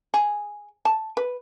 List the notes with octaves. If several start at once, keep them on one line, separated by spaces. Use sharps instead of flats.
G#4
A5
B4